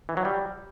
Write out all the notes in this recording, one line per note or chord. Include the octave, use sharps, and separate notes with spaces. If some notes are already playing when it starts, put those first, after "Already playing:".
E3
F#3
G3